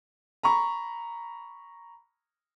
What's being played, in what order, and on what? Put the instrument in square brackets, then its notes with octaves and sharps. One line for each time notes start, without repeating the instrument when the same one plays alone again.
[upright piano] A#5 B5 C#6